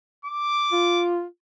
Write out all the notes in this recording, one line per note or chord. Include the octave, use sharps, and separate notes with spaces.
D6
F4